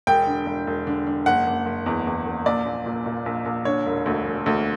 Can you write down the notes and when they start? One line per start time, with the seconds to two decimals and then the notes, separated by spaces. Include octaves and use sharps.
0.07 E1 G5
0.27 D3
0.46 E1
0.67 E1
0.87 D3
1.07 D3
1.26 F#1 F#5
1.47 F#1
1.66 F#1
1.86 E2
2.07 E2
2.26 F#1
2.46 A#1 D5
2.66 A#1
2.86 A#2
3.06 A#2
3.26 A#1
3.46 A#1
3.65 D3 C#5
3.86 E1
4.06 D2
4.26 E1
4.46 D2